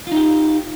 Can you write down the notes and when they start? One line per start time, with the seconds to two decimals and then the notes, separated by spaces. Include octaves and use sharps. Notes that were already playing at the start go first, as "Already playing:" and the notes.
0.07 F4
0.12 D#4
0.16 G4